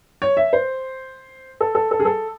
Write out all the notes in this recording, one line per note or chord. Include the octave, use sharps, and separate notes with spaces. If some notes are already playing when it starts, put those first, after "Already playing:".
C#5
E5
C5
A4
A4
A4
G#4
A4